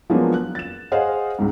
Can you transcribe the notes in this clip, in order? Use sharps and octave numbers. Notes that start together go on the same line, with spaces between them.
F3 F#3 G#3 A#3 B3 D4
F#6
A6 E7
G#4 C5 D#5 F5 F#5
C#2 G#2